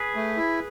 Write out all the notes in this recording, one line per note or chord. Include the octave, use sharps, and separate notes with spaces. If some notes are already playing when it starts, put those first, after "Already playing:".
Already playing: G#4 B4
A3
E4